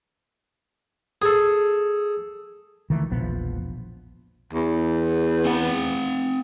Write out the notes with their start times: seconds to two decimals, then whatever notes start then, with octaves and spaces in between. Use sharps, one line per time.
1.22 G#4 A4
2.90 D#3 E3 G#3 A3
3.10 E1 A#1 F3 B3
4.53 E2
5.45 C4 F#5